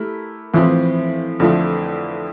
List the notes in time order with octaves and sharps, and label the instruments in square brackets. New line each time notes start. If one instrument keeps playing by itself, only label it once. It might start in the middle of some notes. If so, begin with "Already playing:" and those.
Already playing: [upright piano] A3 E4 G4 A#4
[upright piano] A2 F3 C4 [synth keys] E3
[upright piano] F2 D3 F3 A3